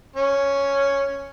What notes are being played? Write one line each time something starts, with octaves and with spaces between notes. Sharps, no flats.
C#4